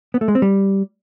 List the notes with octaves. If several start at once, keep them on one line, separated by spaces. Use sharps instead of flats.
B3
A3
G#3
C4
G3